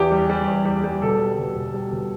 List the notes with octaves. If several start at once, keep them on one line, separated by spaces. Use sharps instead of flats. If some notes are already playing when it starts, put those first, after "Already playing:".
Already playing: E2 G4
G3
G3
E2
G3
G3
B2 A4
G3
B2
B2
G3
B2